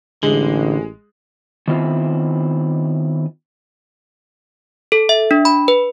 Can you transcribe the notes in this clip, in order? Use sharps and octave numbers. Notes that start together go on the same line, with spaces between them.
A1 D3 G#3
D#3 B3 C4 E4 F4
A4
E5
D4
B5
B4